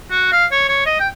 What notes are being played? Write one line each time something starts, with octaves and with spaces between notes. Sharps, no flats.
F#4
F5
C#5
C#5
D#5
G5